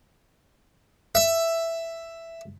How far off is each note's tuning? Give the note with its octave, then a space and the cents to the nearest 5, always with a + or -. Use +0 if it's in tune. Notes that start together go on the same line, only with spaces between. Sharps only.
E5 +5